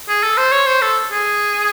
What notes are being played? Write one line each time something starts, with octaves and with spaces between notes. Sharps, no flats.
G#4
A4
C5
C#5
C5
A4
G#4